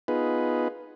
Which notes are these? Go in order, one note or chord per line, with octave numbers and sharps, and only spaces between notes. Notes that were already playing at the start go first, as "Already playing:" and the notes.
B3 D#4 F4 G#4 B4